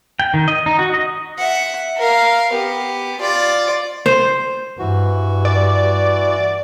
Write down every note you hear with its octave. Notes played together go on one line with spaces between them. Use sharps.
G5
D#3
D#5
D#4
F#4
D#5
E5 F#5
A#4 F5
B3 G4
F4 D5
C5
G2 E3 F#4
D5